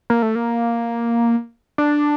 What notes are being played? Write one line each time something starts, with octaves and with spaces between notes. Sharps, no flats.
A#3
A3
A#3
D4